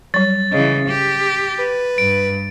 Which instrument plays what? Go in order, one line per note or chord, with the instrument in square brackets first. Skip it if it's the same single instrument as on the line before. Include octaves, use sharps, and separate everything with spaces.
[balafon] F#3 G3 [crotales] A6
[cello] C#3 E3 [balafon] D#5
[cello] G4
[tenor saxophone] B4
[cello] G2 [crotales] D7